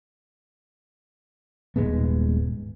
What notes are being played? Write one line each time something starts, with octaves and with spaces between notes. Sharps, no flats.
D#1 G#2 G#3 B3